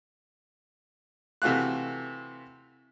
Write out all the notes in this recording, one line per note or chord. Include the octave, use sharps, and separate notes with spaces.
C3 E3 A3 F#4 F5 F#6